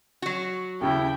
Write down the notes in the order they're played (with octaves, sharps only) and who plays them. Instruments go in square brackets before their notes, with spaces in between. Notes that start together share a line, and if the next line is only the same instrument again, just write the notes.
[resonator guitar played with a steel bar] F#3 F#4
[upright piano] D#2 C#3 [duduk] E4 [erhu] G5